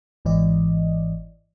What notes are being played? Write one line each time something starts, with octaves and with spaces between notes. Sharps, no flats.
G#1 G#2 E3 D5 D#5